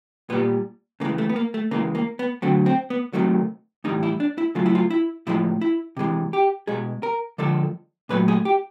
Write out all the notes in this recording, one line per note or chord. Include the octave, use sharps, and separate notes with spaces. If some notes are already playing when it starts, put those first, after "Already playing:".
A#2 G3 B3
C#3 E3 G#3 A#3
A3
B3
A#3
A3
C#3 E3 G#3 A#3
A#3
B3
D3 F#3 A3 C4
C4
B3
C3 D#3 F#3 A3
A2 E3 G3 D#4
E4
D4
E4
C#3 F#3 A3 F4
E4
F4
E4
A2 F3 G#3 E4
E4
C3 E3 G#3
G4
B2 G#3 G#4
A#4
D3 F3 G#3 A4
A#2 F#3 A3 B4
G#4
G4